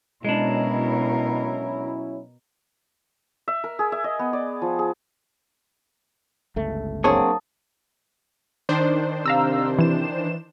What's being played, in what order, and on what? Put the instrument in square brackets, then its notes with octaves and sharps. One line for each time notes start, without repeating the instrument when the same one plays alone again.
[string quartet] B2 A#4 [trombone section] F#3 C#4 E4 [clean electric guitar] G#3 D4
[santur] E5
A#4
G#4
E5
D#5
B3
D5
F3
G#4
[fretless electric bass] G1 C#2 A3
[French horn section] F#3 A#3 D4 [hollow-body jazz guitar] C4 G#4 C#5 [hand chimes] A5 D#6
[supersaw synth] D#3 D4 C5
[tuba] C3 [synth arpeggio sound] F5 A#5 E6
[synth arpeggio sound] E3 E7